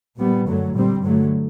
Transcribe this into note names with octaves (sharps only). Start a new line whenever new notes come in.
A#2 G3 B3
F#2 D3 F#3 A3
A#2 G3 C4
G2 D3 F#3 A3